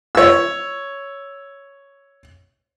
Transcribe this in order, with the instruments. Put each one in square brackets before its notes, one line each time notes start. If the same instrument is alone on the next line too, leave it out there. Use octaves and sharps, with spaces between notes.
[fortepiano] C#5 E6